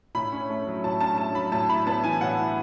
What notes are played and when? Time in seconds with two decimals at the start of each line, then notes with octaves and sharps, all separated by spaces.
0.15 A2 B5
0.32 C#4
0.50 A3
0.67 F#3
0.84 A2 A5
1.01 C#4 A5
1.18 A3 A5
1.35 F#3 B5
1.52 A2 A5
1.69 E4 B5
1.86 B3 A5
2.04 E3 G#5
2.21 A2 F#5
2.38 E4